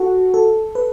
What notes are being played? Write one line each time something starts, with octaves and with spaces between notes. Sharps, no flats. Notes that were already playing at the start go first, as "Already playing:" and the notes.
Already playing: F#4 A4
A4
B4